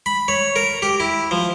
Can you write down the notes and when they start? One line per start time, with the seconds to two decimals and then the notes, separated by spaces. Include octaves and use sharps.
0.06 B5
0.28 C#5
0.56 A#4
0.82 G4
1.00 E4
1.31 F3